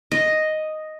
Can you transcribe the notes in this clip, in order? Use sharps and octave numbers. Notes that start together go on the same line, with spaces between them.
D#5